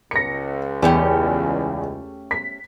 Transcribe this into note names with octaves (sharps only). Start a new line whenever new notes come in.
C#2 A#6 C#7
E2 A3 C#4 G4
B6